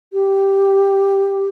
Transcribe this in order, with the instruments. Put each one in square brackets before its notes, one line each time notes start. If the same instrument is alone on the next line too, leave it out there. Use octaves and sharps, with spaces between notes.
[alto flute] G4